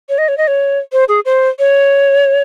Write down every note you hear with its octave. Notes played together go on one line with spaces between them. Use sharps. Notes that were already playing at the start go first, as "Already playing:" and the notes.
C#5
D#5
C#5
D#5
C#5
C5
G#4
C5
C#5